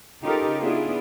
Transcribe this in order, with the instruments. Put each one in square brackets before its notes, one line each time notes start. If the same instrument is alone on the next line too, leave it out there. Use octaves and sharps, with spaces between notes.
[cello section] C#3 D#4 F4 G4 A4 A#4
B3 D4 E4 F4 G#4